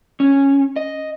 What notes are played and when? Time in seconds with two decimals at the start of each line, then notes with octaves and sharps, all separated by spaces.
0.20 C#4
0.76 D#5